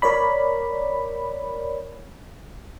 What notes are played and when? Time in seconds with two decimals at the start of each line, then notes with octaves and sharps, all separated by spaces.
0.02 A#4 C#5 D5 B5